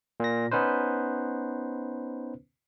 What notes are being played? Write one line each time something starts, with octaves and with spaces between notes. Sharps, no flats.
A#2 A#6
B3 C#4 D#4 B4 C5